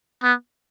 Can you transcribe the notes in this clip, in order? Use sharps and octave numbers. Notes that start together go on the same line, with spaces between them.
B3